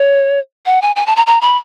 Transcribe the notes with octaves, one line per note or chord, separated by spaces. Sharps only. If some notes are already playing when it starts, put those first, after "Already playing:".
Already playing: C#5
F#5
G#5
G#5
A5
A#5
A#5
B5